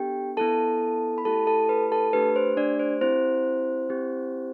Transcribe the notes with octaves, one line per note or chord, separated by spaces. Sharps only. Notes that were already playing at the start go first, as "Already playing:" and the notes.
Already playing: B3 D4 G4 A4 G5
B3 E4 A4 A5
B5
A3 E4 G4 A4 A5
A4 A5
B4 B5
A4 A5
A3 D4 G4 B4
C5
D4 D5
C5
C4 E4 G4 C5
C4 E4 G4